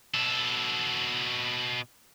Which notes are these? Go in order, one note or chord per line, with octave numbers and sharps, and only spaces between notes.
B2 A4